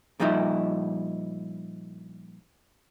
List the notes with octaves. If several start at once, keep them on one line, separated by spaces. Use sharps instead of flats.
A#2 F3 G3 D#4 E4